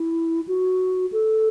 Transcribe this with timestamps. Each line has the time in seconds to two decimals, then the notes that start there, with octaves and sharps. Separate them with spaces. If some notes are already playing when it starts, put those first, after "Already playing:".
Already playing: E4
0.48 F#4
1.12 A4